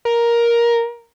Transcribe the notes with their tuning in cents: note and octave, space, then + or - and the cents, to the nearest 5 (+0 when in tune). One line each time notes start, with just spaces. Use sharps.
A#4 +10